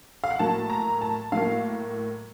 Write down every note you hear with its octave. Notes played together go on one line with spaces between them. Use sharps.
F5
F#5
A2 F#3 A#3 A5
A#5
A5
A2 F#3 A#3 F5